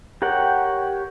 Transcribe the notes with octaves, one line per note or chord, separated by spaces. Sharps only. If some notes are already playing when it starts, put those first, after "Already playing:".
G4 A#4 C#5 F#5 G5